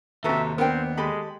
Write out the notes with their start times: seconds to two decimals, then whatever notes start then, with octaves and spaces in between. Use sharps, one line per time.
0.24 D#2 C3 F#4 A4 B4 E5 A#5
0.58 B3 C4 D4 A#4 G5
0.97 G#3 G4 A4 D#5 B5